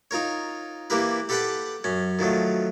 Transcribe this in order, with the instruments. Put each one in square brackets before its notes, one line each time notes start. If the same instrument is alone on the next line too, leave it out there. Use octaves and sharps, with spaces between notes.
[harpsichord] D#4 F4 A#4 C#5
E3 A#3 E4 G4 A#4 B4
G4 A4 B4 F#5 G5 A5
F#2 C#4
D#3 F3 F#3 A3